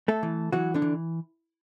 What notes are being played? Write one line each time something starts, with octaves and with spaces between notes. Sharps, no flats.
A3 A4
E3
E3 F#3 F#4
D3 D4
E3